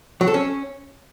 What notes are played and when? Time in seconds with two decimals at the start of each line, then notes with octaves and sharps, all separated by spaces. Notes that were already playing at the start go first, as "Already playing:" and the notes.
0.21 F#3
0.27 A4
0.34 C#4